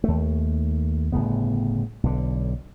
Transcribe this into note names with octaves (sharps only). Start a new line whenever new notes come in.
D#2 A3
G1 A2 C#3 B3
B1 D3